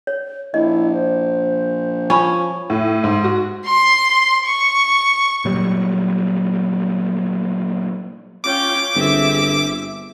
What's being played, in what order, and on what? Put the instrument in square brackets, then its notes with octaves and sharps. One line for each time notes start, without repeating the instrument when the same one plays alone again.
[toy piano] C#5
[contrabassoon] A#1 [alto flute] E4 [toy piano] D#5
[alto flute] C5
[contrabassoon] F3 [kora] C#4 [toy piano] G#5 B5
[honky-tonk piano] A2
G#2
F#4
[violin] C6
C#6
[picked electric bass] A#2 F#3 G3
[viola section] C#4 F4 G5 [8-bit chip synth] D6
[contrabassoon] G1 [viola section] C4 G#4 E5